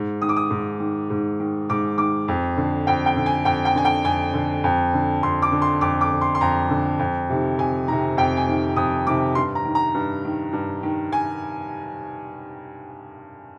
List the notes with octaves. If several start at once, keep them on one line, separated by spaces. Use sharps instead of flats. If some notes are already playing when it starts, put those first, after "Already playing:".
Already playing: G#2
D#3 D#6
D6
D#6
G#2
D#3
G#2
D#3
G#2 D6
D#3 D6
F2
D3
F2 G5
G5
D3
G#5
F2 G5
G5
D3 G#5
G5
F2 G#5
D3
F2
D3
F2 C6
D6
D3
C6
F2 D6
D6
D3
C6
C6
F2 A#5
D3
F2
C3 D#3
F2 G#5
C3 D#3 A#5
F2 G5
G#5
C3 D#3
F2 D#6
C3 D#3 D6
G2 C6
A#5
D#3
A#5
G2
D#3
G2
D#3
G#5